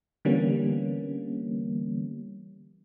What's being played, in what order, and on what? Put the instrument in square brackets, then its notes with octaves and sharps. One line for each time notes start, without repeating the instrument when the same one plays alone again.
[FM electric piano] D3 E3 G3 A#3 B3 C#4